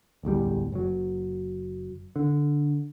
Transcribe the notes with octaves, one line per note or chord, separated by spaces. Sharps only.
D1 A1 E2 G3
F#1 F#3
D3